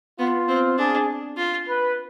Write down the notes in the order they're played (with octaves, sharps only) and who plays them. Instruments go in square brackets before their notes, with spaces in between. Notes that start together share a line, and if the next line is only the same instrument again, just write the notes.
[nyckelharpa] B3 [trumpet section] F4
[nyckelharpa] C4
[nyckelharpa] D4 [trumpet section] G#4
[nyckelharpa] F4
[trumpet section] B4